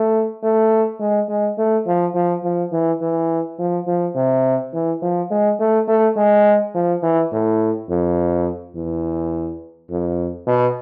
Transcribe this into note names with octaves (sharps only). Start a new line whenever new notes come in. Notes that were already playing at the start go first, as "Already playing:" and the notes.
Already playing: A3
A3
G#3
G#3
A3
F3
F3
F3
E3
E3
F3
F3
C3
E3
F3
G#3
A3
A3
G#3
F3
E3
A2
F2
E2
F2
B2